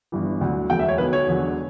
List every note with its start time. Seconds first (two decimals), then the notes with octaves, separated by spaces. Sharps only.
0.12 G1 G2 E3
0.41 D2 D3 F#3
0.69 E1 D2 D3 F#3 G5
0.79 E5
0.88 C#5
0.98 B1 B2 F#3 B4
1.13 C#5
1.27 E1 E2 D3 F#3